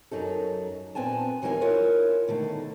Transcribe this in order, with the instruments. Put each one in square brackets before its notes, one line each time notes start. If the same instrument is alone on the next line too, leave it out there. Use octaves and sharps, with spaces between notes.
[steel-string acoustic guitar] F#2 F#3 D#4 A4
A#2 B3 C4 G#5 A5
D#2 E3 F#3 A#3 D#4 G#5
E4 F4 A#4 C#5
B2 D3 D#3 A3